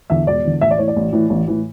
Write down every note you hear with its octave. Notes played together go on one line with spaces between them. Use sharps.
E2 D3 E5
E1 D5
E2 D3
A1 E5
D5
A2 E3 C#5
D5
A1
A2 E3
A1
A2 E3